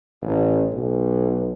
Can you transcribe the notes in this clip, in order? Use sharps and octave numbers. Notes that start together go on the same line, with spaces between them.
A1
B1